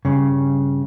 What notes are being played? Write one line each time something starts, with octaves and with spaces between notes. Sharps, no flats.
G2 C#3